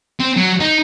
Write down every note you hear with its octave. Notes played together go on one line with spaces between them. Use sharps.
C4
F#3
D#4